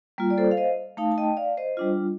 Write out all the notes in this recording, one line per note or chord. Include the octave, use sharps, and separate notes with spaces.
G3 A#3 F4
D5
A4 C5
F5
C5 D#5
A3 D#4 F5 A5
A5
D#5 G5
D5 F5
C5 D#5
G3 D4 F4